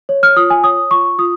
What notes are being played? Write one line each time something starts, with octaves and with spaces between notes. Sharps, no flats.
C#5
F6
F4 D#6
G#5
C#5 D#6
F4 C#6
F4 D#6